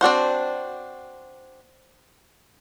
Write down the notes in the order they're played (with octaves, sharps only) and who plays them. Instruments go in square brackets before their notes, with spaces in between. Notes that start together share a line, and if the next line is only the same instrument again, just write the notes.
[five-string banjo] C4 D4 F#4 C5